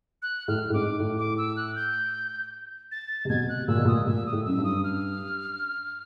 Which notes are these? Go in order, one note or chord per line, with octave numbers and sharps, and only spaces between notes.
F#6
A2 F6
A2
G#2 D6
A2
D6
E6
F#6
G6
A6
C3
B2 G#6
F#6
A#2 E6
B2
A#2 D#6
A#2 E6
D#6
A2
F#2 E6
G2
D#6
F6